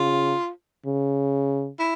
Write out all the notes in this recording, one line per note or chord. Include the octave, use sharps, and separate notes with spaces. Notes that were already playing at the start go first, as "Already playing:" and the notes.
Already playing: C#3 F4
C#3
E4